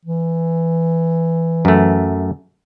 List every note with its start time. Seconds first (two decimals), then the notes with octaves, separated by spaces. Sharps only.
0.06 E3
1.65 F#2 A3